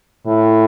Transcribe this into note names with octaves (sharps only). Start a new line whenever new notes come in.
A2